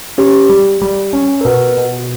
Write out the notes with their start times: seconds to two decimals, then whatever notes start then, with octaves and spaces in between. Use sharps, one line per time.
0.18 C#4 G4
0.49 G3
0.82 G3
1.13 C#4
1.41 A#4
1.45 B2 B4
1.77 B2